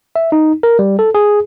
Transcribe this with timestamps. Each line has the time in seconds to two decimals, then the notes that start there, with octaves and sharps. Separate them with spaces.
0.16 E5
0.32 D#4
0.63 A#4
0.79 G3
0.99 A4
1.15 G#4